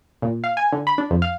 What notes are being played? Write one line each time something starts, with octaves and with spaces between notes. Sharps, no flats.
A#2
F5
G#5
D3
B5
D4
F2
F5